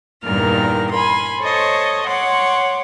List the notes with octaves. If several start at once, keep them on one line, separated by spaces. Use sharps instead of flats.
E2 G2 A#2 D#3 A#3 F6
G#5 B5 C6
A4 C5 C#5 D#5 A5 C#6
C#5 F#5 C6 D6